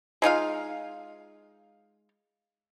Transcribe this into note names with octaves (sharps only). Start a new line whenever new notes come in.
G#3 D#4 F4 F5